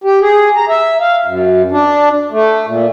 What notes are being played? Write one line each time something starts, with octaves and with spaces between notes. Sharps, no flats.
G4
G#4
A#5
E5
F5
F#2
D4
A3
A#2